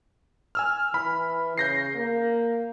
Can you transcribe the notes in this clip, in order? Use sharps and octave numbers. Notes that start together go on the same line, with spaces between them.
G#5 E6 F6
E3 B5
C#3 G6 A#6 C7
A#3